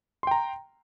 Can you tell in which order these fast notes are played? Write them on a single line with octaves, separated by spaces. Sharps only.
C6 G5 A#5